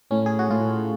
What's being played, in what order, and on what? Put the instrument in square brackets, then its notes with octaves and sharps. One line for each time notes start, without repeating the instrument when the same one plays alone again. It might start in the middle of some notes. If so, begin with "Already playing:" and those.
[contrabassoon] A2 [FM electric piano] C#4
[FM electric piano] G#4
F#4
[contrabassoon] A2 [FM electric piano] F4